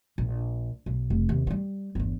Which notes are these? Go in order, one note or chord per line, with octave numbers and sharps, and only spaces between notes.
A#1
B1
F1
D#2 C3
F3 G3
G1 E2